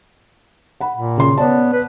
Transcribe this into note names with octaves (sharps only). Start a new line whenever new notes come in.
F#5 B5
A#2
C#3 C6
B3 C#5 D5 A5
B4